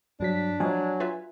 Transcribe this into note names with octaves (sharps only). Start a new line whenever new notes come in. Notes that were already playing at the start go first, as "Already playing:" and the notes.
G2 F#3 D4 B6
A#2 F3 F#3 G#3 G#5
F4 B4 E5